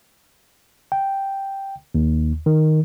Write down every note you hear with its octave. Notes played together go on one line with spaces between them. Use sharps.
G5
D#2
D#3